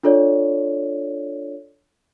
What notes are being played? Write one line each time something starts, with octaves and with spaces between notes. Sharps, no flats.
D4 F4 A4 C#5 D5